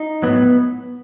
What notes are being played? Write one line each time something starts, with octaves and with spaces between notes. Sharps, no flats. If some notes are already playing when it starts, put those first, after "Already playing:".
Already playing: D#4
A2 F#3 B3